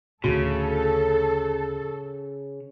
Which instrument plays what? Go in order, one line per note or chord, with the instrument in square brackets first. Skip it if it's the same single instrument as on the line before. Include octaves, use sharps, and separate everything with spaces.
[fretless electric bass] D2 A2 [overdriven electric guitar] C#3 [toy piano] F#4 [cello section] A4